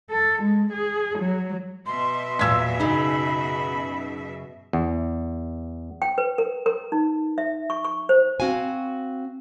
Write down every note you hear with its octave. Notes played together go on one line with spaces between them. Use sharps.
A4
G#3
G#4
F#3
B2 E5 C6
E2 A#2 F#3 E6 G#6 B6
F#2 C#3 D#4 B5
E2
G5
B4
A#4
A#4
D#4
E5
C#6
C#6
C5
C4 F#4 F5 G#5